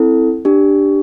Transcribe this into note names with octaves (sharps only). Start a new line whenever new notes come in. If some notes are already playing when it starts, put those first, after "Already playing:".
Already playing: C4 E4 A4
D4 G4